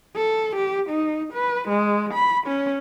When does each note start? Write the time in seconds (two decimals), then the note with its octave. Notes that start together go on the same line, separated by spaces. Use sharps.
0.16 A4
0.56 G4
0.90 D#4
1.33 B4
1.69 G#3
2.14 B5
2.47 C#4